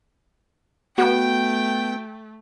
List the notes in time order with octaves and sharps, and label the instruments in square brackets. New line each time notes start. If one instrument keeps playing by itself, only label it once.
[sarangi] A3 [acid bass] B3 [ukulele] F#4 [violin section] G5